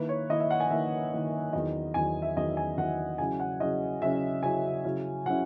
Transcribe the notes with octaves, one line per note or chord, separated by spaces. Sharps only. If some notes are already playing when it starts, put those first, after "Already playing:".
Already playing: D#3 A#3 E4 B4
C#5
D#3 A#3 E4 D#5
E5
F#5
G#5
D#3 A#3 E4 E5
D#3 A#3 E4
E2 D#3 F#3 D#5
E2 D#3 F#3 G#5
E5
E2 D#3 F#3 D#5
G#5
E2 D#3 F#3 F#5
C#3 F#3 C#4 E4 G#5
F#5
C#3 F#3 C#4 E4 D#5
C#3 F#3 C#4 E4 E5
C#3 F#3 C#4 E4 G#5
C#3 F#3 C#4 E4
C#3 F#3 C#4 E4 F#5